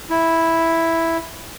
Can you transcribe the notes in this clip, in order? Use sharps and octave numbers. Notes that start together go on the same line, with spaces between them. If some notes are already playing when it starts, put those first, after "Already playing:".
E4